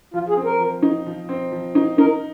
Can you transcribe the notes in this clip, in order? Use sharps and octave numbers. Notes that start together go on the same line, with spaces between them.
F3 F4
G#4
C4
A#4
F3
D#4
F3
C4
F3
D#4
D#4 A#4